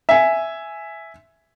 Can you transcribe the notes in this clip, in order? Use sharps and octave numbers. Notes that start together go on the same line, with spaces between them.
E5 G#5